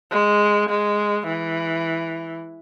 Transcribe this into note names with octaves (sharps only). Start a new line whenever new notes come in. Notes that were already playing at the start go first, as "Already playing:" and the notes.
G#3
G#3
E3